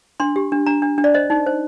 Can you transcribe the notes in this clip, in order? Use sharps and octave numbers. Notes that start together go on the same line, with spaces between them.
D4 C6
G4
D4
D4 A#5
D4
D4
D5
C5 D#5
D#4
C5